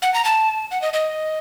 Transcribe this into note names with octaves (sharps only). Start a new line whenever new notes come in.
F#5
A#5
A5
F#5
D#5
D#5